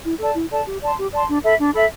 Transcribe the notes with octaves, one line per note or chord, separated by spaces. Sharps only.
E4
A4 D5 A5
E4
A4 D5 A5
G4
D5 A5 C6
G4
D5 A5 C6
D4
A4 E5 B5
D4
A4 E5 B5